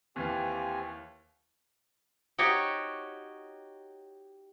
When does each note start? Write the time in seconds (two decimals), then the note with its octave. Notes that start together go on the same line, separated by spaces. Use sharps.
0.16 D#2 E3 C4 G4 F5 G#5
2.38 D#4 F#4 G4 C#5